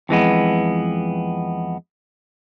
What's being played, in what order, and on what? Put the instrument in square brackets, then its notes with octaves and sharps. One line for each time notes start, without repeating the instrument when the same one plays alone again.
[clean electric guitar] F2 E3 G#3 B3